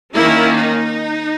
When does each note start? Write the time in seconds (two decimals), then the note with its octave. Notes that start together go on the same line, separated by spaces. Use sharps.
0.14 D#3 A#3 C#4 E4
0.55 D#4